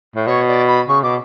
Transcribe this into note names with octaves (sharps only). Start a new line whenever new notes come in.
A2
B2 C#5
D5
B5
C#3 C#6
B2 D6